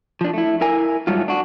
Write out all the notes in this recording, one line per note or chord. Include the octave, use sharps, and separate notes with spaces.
F3 D4
A3 E4
E4 A#4 G#5
G#2 F#3 G3 A3 F4
D4 F#4